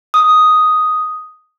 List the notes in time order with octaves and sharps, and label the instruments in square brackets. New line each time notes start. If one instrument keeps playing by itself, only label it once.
[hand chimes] D#6